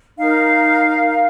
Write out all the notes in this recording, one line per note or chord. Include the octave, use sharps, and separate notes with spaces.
D#4 A#4 F5